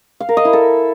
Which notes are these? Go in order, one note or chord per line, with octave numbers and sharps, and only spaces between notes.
F5
A#4
D#5
E4
A4